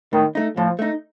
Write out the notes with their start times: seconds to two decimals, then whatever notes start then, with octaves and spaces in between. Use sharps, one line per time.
0.13 A2 D#3
0.35 A3 D#4
0.57 A2 F3
0.79 A3 D#4